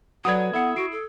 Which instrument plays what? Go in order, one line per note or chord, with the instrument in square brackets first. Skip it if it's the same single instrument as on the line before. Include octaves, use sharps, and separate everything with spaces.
[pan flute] F#3 [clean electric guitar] F#4 A4 B4 [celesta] D5 F#5 [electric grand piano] D#6 G#6
[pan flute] B3 [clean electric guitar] E4 [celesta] A4 F#5 C#7
[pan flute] F#4 [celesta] C7 D7
[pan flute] A4